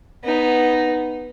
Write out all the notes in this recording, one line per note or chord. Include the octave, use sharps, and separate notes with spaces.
B3 D#4